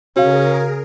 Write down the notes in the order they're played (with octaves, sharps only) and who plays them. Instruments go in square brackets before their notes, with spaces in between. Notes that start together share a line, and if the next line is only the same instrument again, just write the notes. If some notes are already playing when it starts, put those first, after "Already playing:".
[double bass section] C#3 [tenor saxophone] C#4 [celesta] F#4 F5 [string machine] G#4 A#4